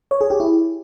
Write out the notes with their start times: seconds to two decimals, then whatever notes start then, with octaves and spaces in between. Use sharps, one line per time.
0.11 C#5
0.21 G#4
0.30 G4
0.40 E4